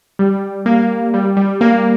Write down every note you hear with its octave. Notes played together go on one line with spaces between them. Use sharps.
G3
A#3
G3
G3
A#3